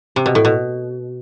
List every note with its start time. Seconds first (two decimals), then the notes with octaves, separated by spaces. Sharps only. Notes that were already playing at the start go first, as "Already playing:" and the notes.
0.16 C3
0.26 B2
0.35 A2
0.45 B2